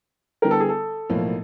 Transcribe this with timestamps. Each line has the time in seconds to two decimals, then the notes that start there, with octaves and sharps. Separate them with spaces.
0.42 D3 G3 B3 E4 G4 A#4
0.51 A4
0.61 G#4
0.69 A4
1.10 B1 A2 F3 A#3